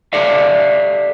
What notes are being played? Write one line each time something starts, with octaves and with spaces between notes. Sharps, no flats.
G4 A4 D5 E5 F5